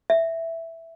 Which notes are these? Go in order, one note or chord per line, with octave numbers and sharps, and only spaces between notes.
E5